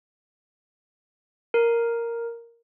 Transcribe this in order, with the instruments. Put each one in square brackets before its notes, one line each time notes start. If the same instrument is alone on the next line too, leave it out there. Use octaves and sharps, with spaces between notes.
[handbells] A#4